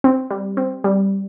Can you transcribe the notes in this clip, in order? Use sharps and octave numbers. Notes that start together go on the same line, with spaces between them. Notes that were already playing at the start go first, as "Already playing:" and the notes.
C4
G3
C4
G3